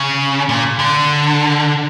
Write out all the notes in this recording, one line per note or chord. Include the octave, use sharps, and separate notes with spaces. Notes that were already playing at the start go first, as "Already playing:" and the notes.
Already playing: C#3
A#2
D3